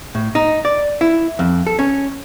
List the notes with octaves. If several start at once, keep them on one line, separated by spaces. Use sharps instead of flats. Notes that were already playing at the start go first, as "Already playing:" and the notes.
A2
D#4
D5
E4
F2
A4
C#4